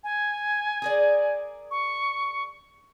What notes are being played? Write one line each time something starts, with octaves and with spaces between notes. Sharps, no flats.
G#5
G#4 A#4 D5
C#6